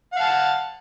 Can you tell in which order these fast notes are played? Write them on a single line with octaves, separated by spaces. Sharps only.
F#5 F5 A5